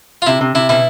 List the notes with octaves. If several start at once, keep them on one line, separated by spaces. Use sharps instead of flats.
F4
C3 E4
C3
C3 E4
B2 E4